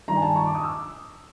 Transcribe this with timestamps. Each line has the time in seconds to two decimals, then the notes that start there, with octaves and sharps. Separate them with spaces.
0.08 G2 D#3 A#5
0.17 G#5
0.22 A5
0.35 C#6
0.46 D6
0.55 D#6
0.64 E6